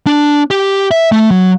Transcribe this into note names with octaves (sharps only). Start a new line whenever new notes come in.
D4
G4
E5
A3
F#3